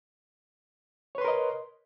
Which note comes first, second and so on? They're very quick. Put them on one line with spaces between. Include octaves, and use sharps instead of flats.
C#5 B4 C6 A#4 D#5